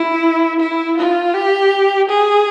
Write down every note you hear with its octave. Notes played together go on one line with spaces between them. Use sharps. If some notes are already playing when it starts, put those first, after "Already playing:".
Already playing: E4
E4
F4
G4
G#4